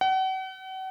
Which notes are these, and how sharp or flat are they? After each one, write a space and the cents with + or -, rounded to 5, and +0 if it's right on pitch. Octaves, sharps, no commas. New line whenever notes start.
F#5 +40